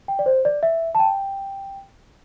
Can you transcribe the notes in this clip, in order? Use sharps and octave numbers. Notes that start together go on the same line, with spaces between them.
G5
D5
C5
D5
E5
A5
G5